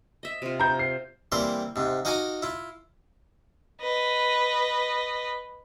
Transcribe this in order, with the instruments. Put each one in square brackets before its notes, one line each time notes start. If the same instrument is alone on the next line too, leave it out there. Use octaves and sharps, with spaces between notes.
[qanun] D#5 E5
C3 F4
[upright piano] A#5 G6
C7
[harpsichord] E3 G3 A#3 C4 C5
G#2 C3
D#4 F#4 F5 G#5 A#5 D6
E4 F4
[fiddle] B4 D#5